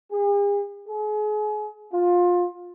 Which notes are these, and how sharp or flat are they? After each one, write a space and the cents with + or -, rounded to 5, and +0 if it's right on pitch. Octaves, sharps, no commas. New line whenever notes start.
G#4 -45
G#4 +35
F4 +20